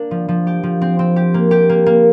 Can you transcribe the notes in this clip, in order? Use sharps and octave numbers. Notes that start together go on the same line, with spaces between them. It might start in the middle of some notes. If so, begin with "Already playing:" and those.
Already playing: A#3 D4
F3
F3
G4
F3
C4
C4
G4
A#3
G4
A#3
A#3